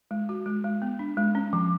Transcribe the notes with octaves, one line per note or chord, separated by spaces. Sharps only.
G#3
F#4
G#3
G#3
B3
D4
G#3
C#4
F3